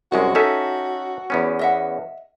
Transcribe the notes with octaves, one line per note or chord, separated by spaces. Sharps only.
C2 F#2 G#3 F#4
C#4 D#4 A4 E5
E2 B3 C#4
D#5 E5 F#5